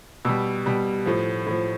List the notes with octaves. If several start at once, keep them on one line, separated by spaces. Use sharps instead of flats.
B2 G3 E6
B2 G3
A2 F3
A2 F3